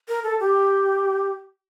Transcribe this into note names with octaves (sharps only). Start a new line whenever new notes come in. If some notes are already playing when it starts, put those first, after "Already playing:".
A#4
A4
G4